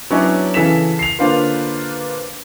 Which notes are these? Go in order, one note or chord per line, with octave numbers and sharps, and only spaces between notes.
F#3 B3 C#4 D4 E4
C#3 E3 A4 B6 E7
C7 F7
D3 A#3 D4 F4 B4 C5